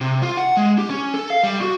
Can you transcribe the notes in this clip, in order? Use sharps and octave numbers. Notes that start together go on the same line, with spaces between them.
C3
F4
F#5
G#3
G4
C#4
A4
F5
G3
F#4